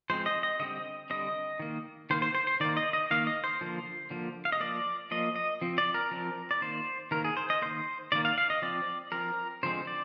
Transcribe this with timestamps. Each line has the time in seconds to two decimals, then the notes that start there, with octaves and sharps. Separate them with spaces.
0.10 F3 G#3 C4 C5
0.26 D#5
0.43 D#5
0.60 D3 G3 C4 D#5
1.10 D3 G3 C4 D#5
1.59 D#3 A#3
2.10 D#3 A#3 C5
2.22 C5
2.35 C5
2.47 C5
2.60 D#3 A#3 D5
2.77 D#5
2.93 D#5
3.11 D#3 A#3 F5
3.27 D#5
3.44 C5
3.61 D3 F3 A#3
4.10 D3 F3 A#3
4.45 F5
4.52 D#5
4.60 F3 A#3 D5
5.11 F3 A#3 D#5
5.36 D#5
5.62 F3 C4
5.78 D5
5.94 A#4
6.11 F3 C4
6.51 D5
6.61 D#3 A#3 C5
7.11 D#3 A#3 A#4
7.25 G#4
7.37 C5
7.50 D#5
7.62 D#3 A#3 C5
8.12 D#3 A#3 D5
8.25 F5
8.38 F5
8.50 D#5
8.62 F3 C4 D5
9.12 F3 C4 A#4
9.63 D3 F3 G#3 C4 C5
9.87 D5